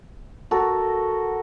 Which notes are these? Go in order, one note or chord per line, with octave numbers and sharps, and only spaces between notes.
F#4 A4 A#4